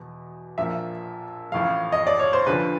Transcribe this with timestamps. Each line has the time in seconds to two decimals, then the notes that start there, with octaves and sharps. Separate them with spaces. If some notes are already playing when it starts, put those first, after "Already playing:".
Already playing: E2 B2
0.58 A#1 A#2 F3 E5
1.52 A1 A2 F3 F5
1.92 D#5
2.07 D5
2.19 C#5
2.33 C5
2.46 D2 D3 F3 B4